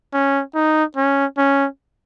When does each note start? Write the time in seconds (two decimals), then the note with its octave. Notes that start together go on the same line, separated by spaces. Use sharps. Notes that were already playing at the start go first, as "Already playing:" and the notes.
0.13 C#4
0.55 D#4
0.96 C#4
1.37 C#4